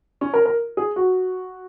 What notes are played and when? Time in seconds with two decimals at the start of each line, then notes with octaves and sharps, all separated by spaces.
0.21 C#4
0.34 A#4
0.46 A#4
0.77 G#4
0.96 F#4